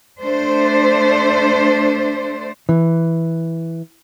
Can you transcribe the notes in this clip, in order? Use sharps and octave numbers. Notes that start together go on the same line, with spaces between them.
A3 D4 C5
E3